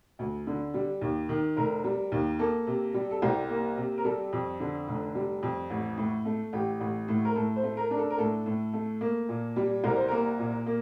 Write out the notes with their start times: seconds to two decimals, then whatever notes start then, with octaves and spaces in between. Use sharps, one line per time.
0.19 D2
0.47 D3
0.74 G3
1.01 D#2
1.29 D#3
1.57 F1 A#4
1.84 G3
2.12 D#2
2.39 A#3 A4
2.67 C3
2.94 G3
3.11 A4
3.22 C2 G4
3.49 A#3
3.77 C3
3.98 A#4
4.05 G3 A4
4.33 F2
4.60 D3
4.88 F1
5.15 G3
5.43 F2
5.70 A1
5.98 A2
6.25 A3
6.53 A1 G4
6.80 A1
7.08 A2
7.25 A#4
7.36 A2 A4
7.56 C5
7.63 A3
7.77 A#4
7.91 D4 A#4
7.98 A4
8.10 A#4
8.18 A2 A4
8.46 A2
8.74 A3
9.01 A#3
9.29 A#2
9.56 G3
9.84 C2 A#4
9.96 C5
10.08 A#3 A#4
10.39 A#2
10.66 A#3